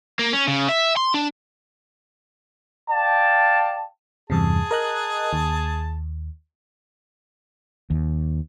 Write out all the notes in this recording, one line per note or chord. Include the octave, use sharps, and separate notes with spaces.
A#3
C#4
C#3
E5
C6
D4
D5 F5 G5 A5
E2 G2 C3 G#4 A5
A#4 D#5 F#6
D#2
D#2